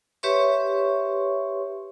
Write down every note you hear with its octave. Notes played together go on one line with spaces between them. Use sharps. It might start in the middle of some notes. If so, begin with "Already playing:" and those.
G4 B4 C#5 E5 C6 C#6